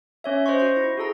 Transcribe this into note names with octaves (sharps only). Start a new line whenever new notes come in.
C#4 C#5 E5
C5 D#5 C6 C#6
F#4 C#6
E4
F#4 G#4 A4 A#5